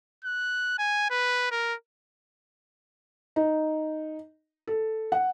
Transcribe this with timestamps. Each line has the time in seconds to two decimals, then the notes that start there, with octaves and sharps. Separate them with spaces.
0.25 F#6
0.78 G#5
1.10 B4
1.51 A#4
3.36 D#4
4.67 A4
5.12 F#5